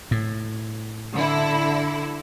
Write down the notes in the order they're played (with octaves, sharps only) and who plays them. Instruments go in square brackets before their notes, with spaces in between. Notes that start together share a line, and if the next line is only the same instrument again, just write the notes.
[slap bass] A2
[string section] D3 E4